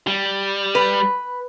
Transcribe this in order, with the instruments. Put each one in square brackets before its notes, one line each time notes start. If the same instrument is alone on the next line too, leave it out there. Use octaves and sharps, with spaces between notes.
[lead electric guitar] G3
[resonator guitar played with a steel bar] B4